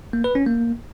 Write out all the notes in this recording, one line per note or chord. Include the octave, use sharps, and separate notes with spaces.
A#3
B4
C#4
A#3